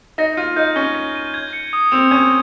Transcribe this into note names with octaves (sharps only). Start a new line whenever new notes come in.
D#4 A#6
F4 D#7
D#4 G6
C#4 G7
A#6
D#7
G#6
C#7
D#6
C4 F7
C#4 G#6